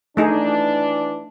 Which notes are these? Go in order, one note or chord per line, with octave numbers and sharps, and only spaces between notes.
E3 A3 D4 D#4 G#4